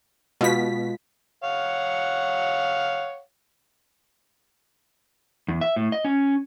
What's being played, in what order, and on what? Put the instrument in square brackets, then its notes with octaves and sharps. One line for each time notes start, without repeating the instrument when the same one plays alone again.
[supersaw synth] B2 B6 [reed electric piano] G#3 F4
[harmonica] C#5 F5 F#5
[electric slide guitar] E2
E5
A2
D#5
C#4